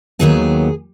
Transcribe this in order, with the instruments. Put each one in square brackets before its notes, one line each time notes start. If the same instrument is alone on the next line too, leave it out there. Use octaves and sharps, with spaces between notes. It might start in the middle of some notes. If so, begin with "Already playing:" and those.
[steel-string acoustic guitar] D#2 D#3 F#3 B3 G#4